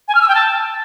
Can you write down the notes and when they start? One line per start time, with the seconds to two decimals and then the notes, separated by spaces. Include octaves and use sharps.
0.08 G#5
0.15 F6
0.22 E6
0.28 G5
0.35 A5